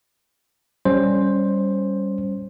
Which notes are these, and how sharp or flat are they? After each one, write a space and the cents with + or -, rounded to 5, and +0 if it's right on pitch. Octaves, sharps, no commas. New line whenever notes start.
G3 +0 C#4 +0 C5 +10